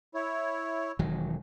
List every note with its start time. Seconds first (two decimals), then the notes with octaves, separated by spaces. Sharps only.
0.14 E4 C#5
0.99 E1 D#3 F#3